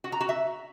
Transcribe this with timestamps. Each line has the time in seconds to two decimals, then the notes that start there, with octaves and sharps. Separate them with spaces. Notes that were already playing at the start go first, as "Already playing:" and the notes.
0.04 F#4
0.12 A#5
0.21 F#4
0.29 E5